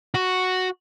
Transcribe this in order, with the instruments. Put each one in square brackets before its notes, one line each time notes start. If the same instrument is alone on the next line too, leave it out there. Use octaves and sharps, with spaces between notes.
[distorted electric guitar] F#4